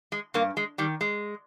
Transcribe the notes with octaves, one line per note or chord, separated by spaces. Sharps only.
G#3
G2 A#3
G#3
D#3 G3
G#3